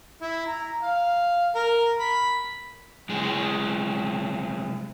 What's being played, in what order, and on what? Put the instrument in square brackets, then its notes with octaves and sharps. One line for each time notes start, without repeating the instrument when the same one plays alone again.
[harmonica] E4
A#5
F5
A#4
B5
[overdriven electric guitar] C2 G#3